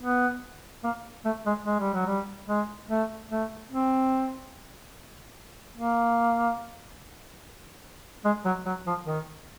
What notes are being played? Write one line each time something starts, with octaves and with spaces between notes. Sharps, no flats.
B3
A#3
A3
G#3
G#3
G3
F#3
G3
G#3
A3
A3
C4
A#3
G#3
F#3
F#3
F3
D#3